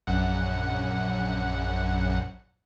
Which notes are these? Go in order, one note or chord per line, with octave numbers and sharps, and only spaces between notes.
A#1 F#2 F#5